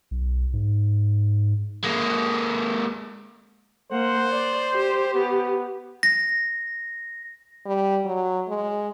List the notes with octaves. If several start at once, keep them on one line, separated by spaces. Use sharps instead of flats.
B1
G#2
G#3 A#3
A#3 C5 F#5
D5
G4
B3
A#6
G3
F#3
G#3